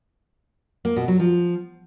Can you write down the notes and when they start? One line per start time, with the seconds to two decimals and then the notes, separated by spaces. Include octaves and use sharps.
0.85 A#3
0.96 B2
1.08 F#3
1.20 F3